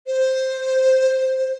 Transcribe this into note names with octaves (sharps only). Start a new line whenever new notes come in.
C5